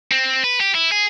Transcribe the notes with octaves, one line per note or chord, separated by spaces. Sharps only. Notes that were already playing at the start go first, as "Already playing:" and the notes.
C4
B4
G4
E4
G#4